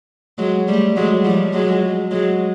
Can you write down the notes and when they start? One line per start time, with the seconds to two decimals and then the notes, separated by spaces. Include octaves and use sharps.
0.38 F#3 G#3
0.68 G3 A3
0.96 F#3 G#3
1.25 F3 G3
1.53 F#3 G#3
2.11 F#3 G#3